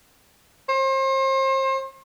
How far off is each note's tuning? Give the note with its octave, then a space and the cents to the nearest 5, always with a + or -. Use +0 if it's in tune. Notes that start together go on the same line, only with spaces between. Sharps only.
C5 +35